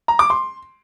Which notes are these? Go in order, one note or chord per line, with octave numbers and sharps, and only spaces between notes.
A#5
D6
C6